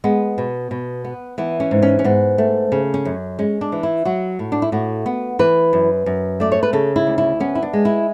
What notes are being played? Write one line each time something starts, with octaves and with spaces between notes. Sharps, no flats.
G#3 B3
B2
B2
B3
E3 B3
C#4
G#2
C#4
C#4
G#2 B3
A3
C#3
C#4
F#2
G#3 C#4
D4
E3
E4
F#3 F#4
A2
D4
E4
A2 F#4
B3
E3 B4
F#2
F#2
A3 D5
C#5
B4
C#3 A4
E4
D2
E4
B3 C#4
E4
D4
G#3
E4